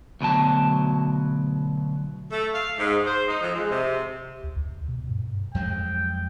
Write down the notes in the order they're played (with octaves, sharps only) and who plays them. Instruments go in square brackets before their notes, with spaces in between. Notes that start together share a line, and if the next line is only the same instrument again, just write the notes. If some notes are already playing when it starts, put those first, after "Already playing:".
[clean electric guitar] D2 B2 F#3 A5
[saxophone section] A3
F5
G#2
C5
D#4
F2
G#3
C3
[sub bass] D2
D2
B2
G2
[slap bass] F2 F#3 G#3 [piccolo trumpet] G5